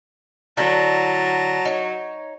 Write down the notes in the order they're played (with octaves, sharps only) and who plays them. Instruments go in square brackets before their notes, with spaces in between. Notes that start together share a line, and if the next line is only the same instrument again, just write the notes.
[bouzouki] D3 E4 [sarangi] F#3 [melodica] A5 A#5
[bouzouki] D#4 C#5